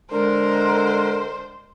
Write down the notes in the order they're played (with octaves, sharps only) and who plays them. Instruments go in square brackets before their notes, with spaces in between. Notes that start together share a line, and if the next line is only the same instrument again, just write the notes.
[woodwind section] D3 G#3 [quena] A#4 [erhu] C5